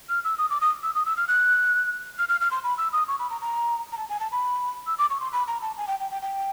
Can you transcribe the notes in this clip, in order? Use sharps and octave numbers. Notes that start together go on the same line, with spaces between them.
F6
E6
D#6
D6
D#6
E6
D#6
E6
F6
F#6
F6
F6
F6
C6
B5
E6
D#6
C#6
B5
A#5
A#5
A#5
A5
G#5
A5
B5
E6
D6
C#6
C6
B5
A#5
A5
G#5
G5
G5
G5
G5